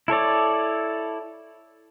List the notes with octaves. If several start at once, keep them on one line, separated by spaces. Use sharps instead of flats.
E4 A4 C#5 D5